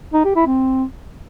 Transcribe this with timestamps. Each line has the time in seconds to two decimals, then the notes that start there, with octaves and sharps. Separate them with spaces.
0.13 D#4
0.25 G4
0.36 E4
0.47 C4